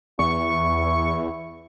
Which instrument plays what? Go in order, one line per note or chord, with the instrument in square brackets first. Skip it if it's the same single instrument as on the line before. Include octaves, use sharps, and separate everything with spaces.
[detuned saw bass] E2 [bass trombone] E4 [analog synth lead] C#6